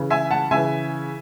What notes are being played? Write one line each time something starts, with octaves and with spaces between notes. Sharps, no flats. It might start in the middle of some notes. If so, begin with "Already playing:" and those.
Already playing: C#3 E3
E5 G#5
F#5 A5
C#3 E3 E5 G#5